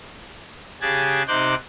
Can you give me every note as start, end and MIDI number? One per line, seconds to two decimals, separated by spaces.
0.81 1.23 49
0.81 1.23 67
0.81 1.23 68
0.81 1.23 81
0.81 1.23 90
0.81 1.23 92
1.28 1.55 48
1.28 1.55 63
1.28 1.55 72
1.28 1.55 86
1.28 1.55 90
1.28 1.55 91